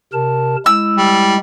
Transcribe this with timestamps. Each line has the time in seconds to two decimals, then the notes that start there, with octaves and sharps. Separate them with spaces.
0.13 C3 A#4 A5
0.66 G#3 E4 E6
0.97 G3